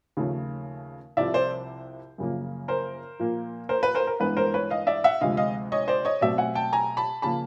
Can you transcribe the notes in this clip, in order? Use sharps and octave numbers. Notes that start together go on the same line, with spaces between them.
D#2 C#3 F3 A3
C2 C3 F3 D5 E5
C5 D5
F#2 C#3 F3 A#3
A#4 C5
A#2 F3 A#3
A#4 C5
B4
A#4 C5
A#4
G2 E3 G#3 B3 B4
A#4 C5
B4 C#5
D#5 F5
D5 E5
E5 F#5
D2 C3 F3 G#3 D#5 F5
D#5 F5
C#5 D#5
C5 D5
C#5 D#5
B2 F#3 A3 C4 D5 E5
F#5 G#5
G5 A5
G#5 A#5
A5 B5
C#3 F3 A#3 A5 B5